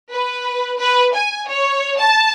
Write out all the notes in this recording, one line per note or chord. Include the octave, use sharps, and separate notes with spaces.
B4
B4
G#5
C#5
A5